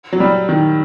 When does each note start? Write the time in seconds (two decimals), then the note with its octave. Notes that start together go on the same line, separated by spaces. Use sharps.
0.13 F#3
0.20 G3
0.49 D#3